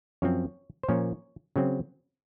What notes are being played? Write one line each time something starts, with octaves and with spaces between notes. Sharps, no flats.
F#2 F3 C4 C#5
C5
A#2 F3 A#3 C#4 C#5
C#3 F#3 C4